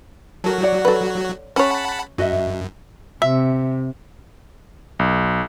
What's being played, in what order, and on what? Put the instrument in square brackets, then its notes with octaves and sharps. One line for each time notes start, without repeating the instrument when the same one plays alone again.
[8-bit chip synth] F#3 F#4 [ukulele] A4 A#4
[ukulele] C#5 D5 F#5
[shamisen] A4 B4
[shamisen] C#4 C#5 [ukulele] G#4 [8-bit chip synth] F#5 A5 B5
[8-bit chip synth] F#2 [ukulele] F#4 D#5 E5
[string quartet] C3 [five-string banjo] E5
[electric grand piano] B1